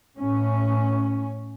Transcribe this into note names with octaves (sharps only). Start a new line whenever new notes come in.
A2 C#4